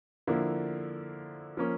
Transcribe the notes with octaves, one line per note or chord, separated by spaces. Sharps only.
D3 F3 A#3 E4
F3 A#3 C#4